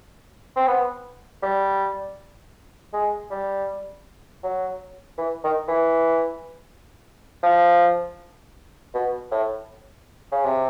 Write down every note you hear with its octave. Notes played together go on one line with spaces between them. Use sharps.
C4
B3
G3
G#3
G3
F#3
E3
D#3
E3
F3
B2
A2
C#3
C3